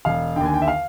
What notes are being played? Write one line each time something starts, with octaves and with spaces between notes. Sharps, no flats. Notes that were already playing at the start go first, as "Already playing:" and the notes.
E1 F5
D#2 D3 G5 G#5
G5
E5
F5